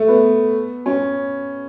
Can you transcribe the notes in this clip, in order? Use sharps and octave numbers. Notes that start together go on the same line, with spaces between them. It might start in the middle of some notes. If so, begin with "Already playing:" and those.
Already playing: A3
B3
C#4